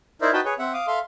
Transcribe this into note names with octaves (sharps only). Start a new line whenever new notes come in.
D#4 E4 A#4 C5 D5 E5
D#4 F#4 B4 G5 A5 B5
G#4 B4 C#5
C4 E5 F#5
F5 D6 D#6
A4 E5 F5 C6